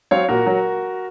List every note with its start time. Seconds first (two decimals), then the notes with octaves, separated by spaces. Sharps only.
0.11 F#3 C4 C#5 F5
0.29 A#2 F#4 A#4
0.46 F#3